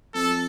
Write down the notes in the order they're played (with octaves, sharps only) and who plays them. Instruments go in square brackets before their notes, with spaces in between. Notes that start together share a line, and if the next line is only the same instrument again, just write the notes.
[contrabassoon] F2 [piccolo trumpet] A4